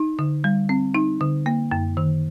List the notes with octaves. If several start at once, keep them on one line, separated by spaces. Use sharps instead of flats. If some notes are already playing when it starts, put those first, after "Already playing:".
Already playing: D#4
D3
G3
C4
D#4
D3
A#3
F#2
D#3